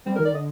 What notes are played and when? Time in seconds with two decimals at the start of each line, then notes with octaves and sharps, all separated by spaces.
0.06 G3 C4
0.16 A#4
0.19 D#3
0.25 D5
0.32 D3 D#5